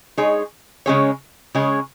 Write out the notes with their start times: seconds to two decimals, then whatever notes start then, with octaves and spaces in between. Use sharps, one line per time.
0.17 G#3 D#4 G#4 C#5
0.86 C#3 G#3 C#4 G#4 C#5
1.55 C#3 G#3 C#4 G#4 C#5